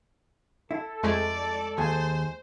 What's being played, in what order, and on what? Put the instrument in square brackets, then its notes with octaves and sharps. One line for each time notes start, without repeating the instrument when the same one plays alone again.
[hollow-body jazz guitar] E4 [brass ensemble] A4
[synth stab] F2 G#3 A3 [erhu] D5
[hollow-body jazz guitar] D#2 G#4 [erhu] C5